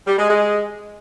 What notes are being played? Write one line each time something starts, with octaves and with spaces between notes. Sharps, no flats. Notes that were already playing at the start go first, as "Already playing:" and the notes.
G3
G#3
G#3